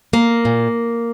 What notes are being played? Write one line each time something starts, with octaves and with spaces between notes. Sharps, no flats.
A#3
A#2